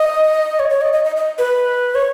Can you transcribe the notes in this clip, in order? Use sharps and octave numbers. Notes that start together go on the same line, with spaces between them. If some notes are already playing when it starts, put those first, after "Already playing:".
Already playing: D#5
C#5
C#5
D#5
D#5
D#5
D#5
B4
C#5